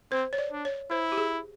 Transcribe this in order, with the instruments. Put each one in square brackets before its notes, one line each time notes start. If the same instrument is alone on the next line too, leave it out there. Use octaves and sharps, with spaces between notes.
[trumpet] C4 [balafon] C5
[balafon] C#5
D5
[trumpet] D4
[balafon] C#5
[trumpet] E4 [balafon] C5
[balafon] G4
G#4